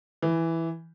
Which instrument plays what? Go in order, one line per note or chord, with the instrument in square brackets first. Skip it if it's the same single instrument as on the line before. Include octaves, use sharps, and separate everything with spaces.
[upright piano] E3